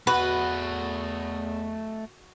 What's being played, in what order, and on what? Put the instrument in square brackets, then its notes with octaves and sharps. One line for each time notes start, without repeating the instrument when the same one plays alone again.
[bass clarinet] E2 [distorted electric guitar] A3 D#5 [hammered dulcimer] F#4 [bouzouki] B4